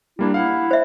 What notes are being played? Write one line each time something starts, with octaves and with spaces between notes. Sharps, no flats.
G3 A#3 D4 E4
E4 F5 F#5
C5 E5